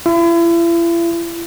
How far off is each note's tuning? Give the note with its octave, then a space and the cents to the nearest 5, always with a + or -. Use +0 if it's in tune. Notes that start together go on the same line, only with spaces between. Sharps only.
E4 +40